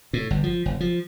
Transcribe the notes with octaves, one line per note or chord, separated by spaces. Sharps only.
A2
G1
F3
F#1
F3